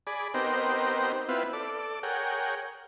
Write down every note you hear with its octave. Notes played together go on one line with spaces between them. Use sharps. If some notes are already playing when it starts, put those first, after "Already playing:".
G#4 D5 B5
B3 C4 D#4 G4 A#4 C5
B3 C4 E4 F4 B4
A4 D5
G#4 A#4 C#5 F#5 G5